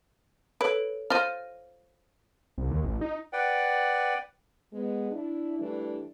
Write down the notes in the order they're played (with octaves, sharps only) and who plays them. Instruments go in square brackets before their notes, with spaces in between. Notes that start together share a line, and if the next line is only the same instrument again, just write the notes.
[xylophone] A4 C#5 D7 [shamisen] B4
[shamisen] F4 C5 [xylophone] F6 A#6 D#7
[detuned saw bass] C2
D#2
A1
D#4
[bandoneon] B4 D5 F#5 G5
[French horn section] G#3 B3
D4 E4
E3 G3 A3 D4